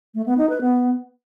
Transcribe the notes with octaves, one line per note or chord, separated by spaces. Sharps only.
A3
B3
D#4
B4
B3